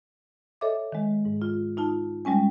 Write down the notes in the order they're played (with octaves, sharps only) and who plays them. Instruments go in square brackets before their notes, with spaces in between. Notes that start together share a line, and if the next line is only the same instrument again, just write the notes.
[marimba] A4 C#5 D#5 E5 D6
D#3 G#3
G#2
F4
D#4 F4 A5
G3 G#3 C#4 G#5